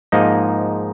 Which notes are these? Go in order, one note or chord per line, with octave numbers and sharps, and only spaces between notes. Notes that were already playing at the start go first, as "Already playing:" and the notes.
G#2 F3 A#3 D#4 D#5